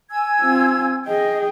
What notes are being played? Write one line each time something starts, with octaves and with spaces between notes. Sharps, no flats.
G#5 E6 G#6
C4 F4
G#4 D#5 G5